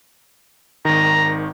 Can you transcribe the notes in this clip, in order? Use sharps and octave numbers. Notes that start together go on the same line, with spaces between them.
G#1 D#3 A#5